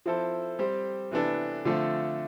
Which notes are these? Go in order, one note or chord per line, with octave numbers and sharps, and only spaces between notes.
F3 C4 E4 A4 C5
G3 C4 G4 C5
C3 E3 B3 D4 A4
D3 F3 A3 C4 F4